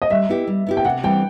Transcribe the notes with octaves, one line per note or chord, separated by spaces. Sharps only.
D#5
G3 E5
B3 E4 G4
G3
B3 E4 G4
G5
C3 F#5
E3 G3 C4 G5